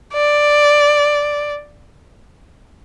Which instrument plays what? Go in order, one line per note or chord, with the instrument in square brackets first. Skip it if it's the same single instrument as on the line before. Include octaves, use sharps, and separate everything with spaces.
[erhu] D5